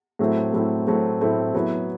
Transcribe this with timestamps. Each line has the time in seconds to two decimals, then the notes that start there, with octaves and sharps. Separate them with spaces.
0.19 A2 F#3 A3 C4 E4
0.53 A2 F#3 A3 C4 E4
0.87 A2 F#3 A3 C4 E4
1.21 A2 F#3 A3 C4 E4
1.54 F#3 B3 E4